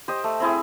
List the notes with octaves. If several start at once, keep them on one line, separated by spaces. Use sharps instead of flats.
G4 C5 D#5
A3
C4 E4 G#4